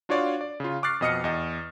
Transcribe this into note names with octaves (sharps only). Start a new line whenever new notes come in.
D4 F4 F#4 C#5 D5 F5
D5
C#3 F4
C#6 D6 F6 F#6 A6 C7
F2 B2 D#5 D#6 F6 C#7
E2 D#5